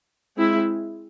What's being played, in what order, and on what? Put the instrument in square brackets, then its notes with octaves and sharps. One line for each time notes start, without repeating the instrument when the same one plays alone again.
[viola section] G#3 C4 E4